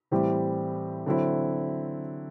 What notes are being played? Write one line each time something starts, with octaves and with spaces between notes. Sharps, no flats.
A2 E3 G3 C4 G4
D3 F#3 C4 E4